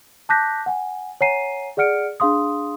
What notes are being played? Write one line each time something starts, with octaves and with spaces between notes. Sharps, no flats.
A5 D6 F#6 G6 A#6 B6
F#5 G#5
C#5 F#5 G#5 A#5 C7 D#7
G#4 D5 F#5 F6 C#7 D7
D4 G#4 F5 C6 D#6